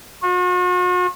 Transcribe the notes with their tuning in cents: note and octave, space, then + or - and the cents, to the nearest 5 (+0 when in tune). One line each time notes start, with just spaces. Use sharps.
F#4 -45